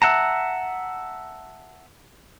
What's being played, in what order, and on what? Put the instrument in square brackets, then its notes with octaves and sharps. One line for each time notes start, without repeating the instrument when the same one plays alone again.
[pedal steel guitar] E5 F#5 A5 A#5